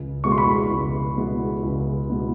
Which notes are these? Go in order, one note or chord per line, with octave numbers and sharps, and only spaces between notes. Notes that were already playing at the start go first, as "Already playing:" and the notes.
Already playing: C#2
B2 G#3 B3 E4 C#6
C6
B5 C#6
C#2
B2 G#3 B3 E4
C#2
B2 G#3 B3 E4